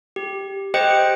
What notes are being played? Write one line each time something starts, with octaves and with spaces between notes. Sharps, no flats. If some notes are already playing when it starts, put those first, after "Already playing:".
G4
G4 C5 D#5 G5 F#6 C#7